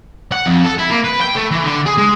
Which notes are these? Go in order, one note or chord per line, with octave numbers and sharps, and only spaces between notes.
F#5
F2
A4
E4
A#3
B4
G5
A3
E3
D3
G#4
G#3